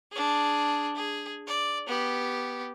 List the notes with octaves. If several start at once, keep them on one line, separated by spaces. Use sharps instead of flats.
D4 G#4
G#4
D5
B3 G4